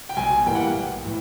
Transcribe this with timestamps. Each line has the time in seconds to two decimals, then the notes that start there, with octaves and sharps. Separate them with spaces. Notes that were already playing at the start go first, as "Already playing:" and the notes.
0.09 G5
0.17 B1 G#5
0.46 A2 E3 G3 A#3 G5
0.55 F#5
0.64 G5
0.75 B1
1.05 A2 E3